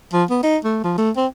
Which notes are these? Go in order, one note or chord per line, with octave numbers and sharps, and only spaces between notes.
F3
B3
D#4
A3
F3
A3
C4